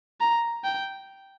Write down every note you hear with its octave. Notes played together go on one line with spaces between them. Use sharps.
A#5
G5